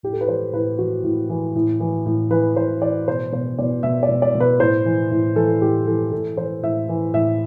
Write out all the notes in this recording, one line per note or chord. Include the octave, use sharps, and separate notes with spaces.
A2 G4
A4
B4
E3 C5
A2 B4
E3 F#4
A2
E3
A2
E3
A2
E3 B4
A2 C5
E3 D5
B2 C5
B2 C5
B2 D5
B2 E5
D5
B2
D5
B2
B4
A2 C5
E3
A2
E3 A4
A2 G4
E3 A4
A2 A4
E3 C5
A2 E5
E3
A2 E5